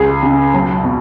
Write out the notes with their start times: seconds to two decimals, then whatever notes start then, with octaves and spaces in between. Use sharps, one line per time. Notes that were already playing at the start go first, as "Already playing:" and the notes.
Already playing: C#2 G#4
0.23 C#3
0.54 B1
0.84 B2